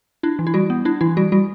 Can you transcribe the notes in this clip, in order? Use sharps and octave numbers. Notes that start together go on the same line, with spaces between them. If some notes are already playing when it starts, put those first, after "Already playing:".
D4 E4
E3
E4
G3 F#4
B3
D4 E4
E3 E4
G3 F#4
G3 F#4